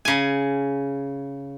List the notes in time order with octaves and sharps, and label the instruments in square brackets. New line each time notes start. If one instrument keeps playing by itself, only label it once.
[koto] C#3 G#5